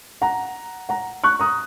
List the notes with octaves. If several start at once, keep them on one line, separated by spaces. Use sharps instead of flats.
F#5 A#5
F#5 A#5
C#6 F#6
A#5 D#6